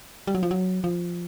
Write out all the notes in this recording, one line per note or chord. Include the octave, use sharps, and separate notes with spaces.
G3
F#3
F3
F#3
F3